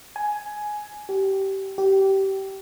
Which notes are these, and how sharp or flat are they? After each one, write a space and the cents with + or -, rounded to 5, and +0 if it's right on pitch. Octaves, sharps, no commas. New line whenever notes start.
G#5 +10
G4 -20
G4 -20